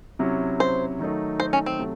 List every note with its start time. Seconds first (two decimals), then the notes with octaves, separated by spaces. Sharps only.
0.19 C3 F#3 C#4 E4
0.60 C5
0.99 D#3 F#3 A3 D#4
1.40 C5
1.53 C#4
1.66 C4
1.79 C3 F#3 A3